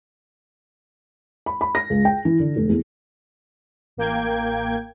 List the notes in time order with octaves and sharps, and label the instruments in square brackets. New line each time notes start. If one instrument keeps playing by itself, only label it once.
[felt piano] B5
B5
A#6
C#2
G5
E3
D3
F1
E2
[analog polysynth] A1 A#3 G5 G#6